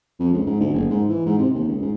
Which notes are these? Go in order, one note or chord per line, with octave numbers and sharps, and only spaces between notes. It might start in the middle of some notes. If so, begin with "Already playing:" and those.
F2
C#2
G#2
D2
F#1
G#2
E3
G#2
C3
D#2
C#2
G#2